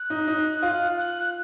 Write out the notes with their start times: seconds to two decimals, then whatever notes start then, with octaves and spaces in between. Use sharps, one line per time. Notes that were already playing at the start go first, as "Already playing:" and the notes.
Already playing: F#6
0.10 D#4
0.27 D#4
0.62 F4
0.98 F#6